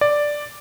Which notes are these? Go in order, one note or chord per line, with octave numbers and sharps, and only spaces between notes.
D5